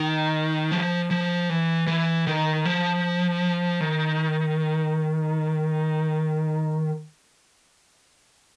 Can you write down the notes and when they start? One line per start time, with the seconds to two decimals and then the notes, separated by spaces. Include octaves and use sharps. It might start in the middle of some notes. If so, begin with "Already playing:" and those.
Already playing: D#3
0.71 F3
1.11 F3
1.50 E3
1.87 E3
2.27 D#3
2.65 F3
3.80 D#3